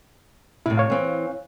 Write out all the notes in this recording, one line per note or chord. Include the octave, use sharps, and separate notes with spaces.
A2 C3 E4
C#5 F5
E3 C4